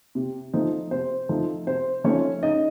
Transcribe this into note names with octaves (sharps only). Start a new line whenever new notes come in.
C3
F3 A3 C4 D#4
C3 C5
F3 A3 C4 D#4
C3 C5
F3 A3 C4 C#4 D#4 C#5
C#3 D#4 D#5